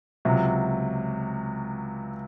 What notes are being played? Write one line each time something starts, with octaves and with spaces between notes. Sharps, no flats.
C#2 C3 F#3